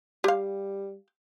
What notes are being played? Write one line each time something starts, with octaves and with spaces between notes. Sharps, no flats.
G3 G4 F5